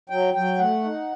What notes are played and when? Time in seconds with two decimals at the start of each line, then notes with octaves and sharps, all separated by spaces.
0.09 F#3 G5
0.34 F#3 G5
0.58 A3 F#5
0.84 D#4